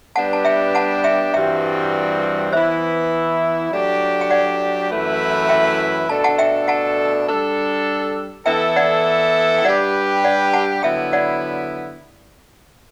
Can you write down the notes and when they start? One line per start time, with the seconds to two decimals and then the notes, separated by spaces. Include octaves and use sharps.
0.16 G3 B3 D4 G4 B4 F#5 A5
0.33 A5
0.45 E5 G5
0.75 F#5 A5
1.04 E5 G5
1.34 G2 E3 G3 C4 F#4 E5 G5
2.53 E3 B3 E4 B4 C5 E5
3.72 F#3 A3 D4 G4
4.21 G5
4.30 D5 F#5
4.90 F#2 E3 A3 E4 B4
5.49 E5 G5
6.09 B2 A3 D4 A4 A5
6.24 F#5 A5
6.38 E5 G5
6.68 F#5 A5
7.28 G3 D4 A4
8.46 E3 B3 E4 A4 E5 G5
8.76 D5 F#5
9.58 G5
9.64 G3 D4 G4 B4 D5 F#5
10.24 D5 F#5
10.53 F#5 A5
10.83 D3 F#3 B3 E4 E5 G5
11.13 D5 F#5